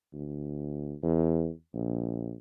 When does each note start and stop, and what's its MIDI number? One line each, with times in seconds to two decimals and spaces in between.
0.13 0.95 38
1.03 1.50 40
1.74 2.35 34